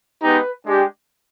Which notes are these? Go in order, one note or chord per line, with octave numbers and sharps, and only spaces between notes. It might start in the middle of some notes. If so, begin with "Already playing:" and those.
G#3 B3 D#4 G4 B4
G#3 D4 G4